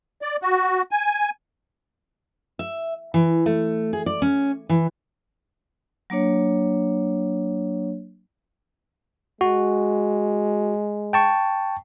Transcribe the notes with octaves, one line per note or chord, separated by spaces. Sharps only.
D5
F#4
G#5
E5
E3
A3
G#4
D5
C#4
E3
F#3 A#3 D4 C#5
G#3 F#4
G5 A5 C#6